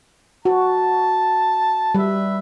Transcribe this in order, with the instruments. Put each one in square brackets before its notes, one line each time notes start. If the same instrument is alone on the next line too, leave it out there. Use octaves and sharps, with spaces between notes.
[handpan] F#4 [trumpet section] A5
[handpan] G3 [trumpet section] B4 E5